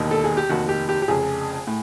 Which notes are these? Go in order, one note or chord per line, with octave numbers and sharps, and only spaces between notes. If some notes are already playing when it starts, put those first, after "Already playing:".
Already playing: E1 D#2 D#3
A4
G#4
G4
F1 D#2 D#3 F#4
G4
G4
G4
F1 F2 C#3 G#4
A2